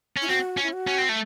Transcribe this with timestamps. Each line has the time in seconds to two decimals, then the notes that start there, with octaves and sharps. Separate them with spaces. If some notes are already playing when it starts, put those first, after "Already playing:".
0.17 C#4
0.22 E4
0.28 C4 F#4
0.57 C#4
0.63 E4
0.73 F#4
0.87 C#4
0.98 C4
1.09 A3